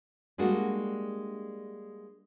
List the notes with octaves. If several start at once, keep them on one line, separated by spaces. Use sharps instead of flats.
G3 G#3 A#3 D4 F#4